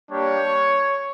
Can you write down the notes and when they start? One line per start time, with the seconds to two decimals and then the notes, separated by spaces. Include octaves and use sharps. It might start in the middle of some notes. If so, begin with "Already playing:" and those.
0.10 G3 A#3 D4 G4 C#5